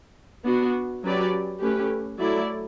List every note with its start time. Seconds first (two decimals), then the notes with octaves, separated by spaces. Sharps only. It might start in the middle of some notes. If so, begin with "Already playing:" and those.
0.45 B3 D4 F#4
1.03 F#3 C#4 G4 B4 D5
1.61 A3 C#4 G4 B4
2.19 F#3 A3 E4 A4 D5